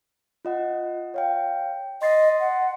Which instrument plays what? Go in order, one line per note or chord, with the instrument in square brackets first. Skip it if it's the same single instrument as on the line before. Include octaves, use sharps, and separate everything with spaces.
[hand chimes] F4 D#5 F#5
C#5 F5 G5
[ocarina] D#5 [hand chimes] C6 A6 C7
[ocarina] F#5